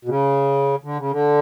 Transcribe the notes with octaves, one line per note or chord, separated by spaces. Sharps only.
B2
C#3
D3
C#3
D3